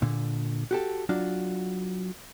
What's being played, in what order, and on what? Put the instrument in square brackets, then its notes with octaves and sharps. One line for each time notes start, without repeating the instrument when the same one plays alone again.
[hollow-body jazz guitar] A#2 D3
F#4 G4 A4
F#3 D4 F4 F#4